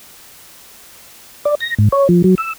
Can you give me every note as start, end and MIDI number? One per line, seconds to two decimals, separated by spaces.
1.45 1.55 74
1.61 1.75 94
1.79 1.89 44
1.92 2.08 73
2.09 2.22 53
2.24 2.35 54
2.38 2.53 88